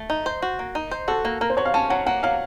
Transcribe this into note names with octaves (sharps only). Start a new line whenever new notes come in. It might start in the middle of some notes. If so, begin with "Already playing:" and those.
Already playing: A3
D#4
C5
F#4
A#3
D#4
C5
F#4 A4
A#3
A#3 A#4
C5
F#3 C#5
F5
C#4 A5
F#3 F#5
A#3 F#5
F#3 F5